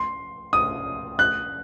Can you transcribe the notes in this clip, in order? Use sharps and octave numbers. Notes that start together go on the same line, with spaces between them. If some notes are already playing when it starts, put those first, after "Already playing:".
Already playing: C6
D#6
F#6